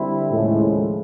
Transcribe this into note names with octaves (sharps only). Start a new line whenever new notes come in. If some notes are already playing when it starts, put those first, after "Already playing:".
Already playing: D3 G3 C4 E4
D#2 A2 C#3 F3 G#3